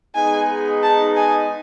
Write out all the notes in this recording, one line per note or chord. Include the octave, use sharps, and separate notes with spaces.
G#3 B3 D#4 G#4 G#5
A5
G#5